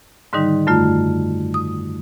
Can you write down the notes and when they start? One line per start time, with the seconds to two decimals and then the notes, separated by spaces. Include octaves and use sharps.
0.33 G#2 D3 D#3 G3 D#4
0.67 F#2 D3 A3 F4
1.54 D#6